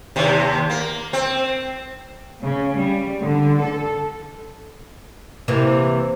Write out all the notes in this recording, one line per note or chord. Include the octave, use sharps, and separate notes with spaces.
D#2 C3
A#3
C4
C#3
G3
D3
A4
C3 E3 A#3